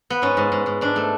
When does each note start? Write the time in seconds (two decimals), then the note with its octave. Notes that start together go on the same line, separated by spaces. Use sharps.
0.10 B3
0.22 G#2 C#4
0.37 G#2
0.52 G#2
0.66 G#2
0.81 G#2 D4
0.96 A3